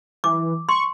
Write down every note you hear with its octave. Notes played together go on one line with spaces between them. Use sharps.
E3 D6
C6 C#6